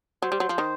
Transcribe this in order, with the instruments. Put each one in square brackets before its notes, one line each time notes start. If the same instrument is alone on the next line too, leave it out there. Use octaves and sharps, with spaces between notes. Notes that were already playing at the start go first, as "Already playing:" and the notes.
[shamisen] F#3 [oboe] C5
[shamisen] G3
F#3
F3
D#3